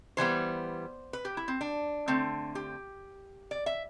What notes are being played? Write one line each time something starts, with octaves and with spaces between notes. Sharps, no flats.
E3 G3 B3 C5
B4
G4
E4
C4
D4
D3 A3 C4
G4
D5
E5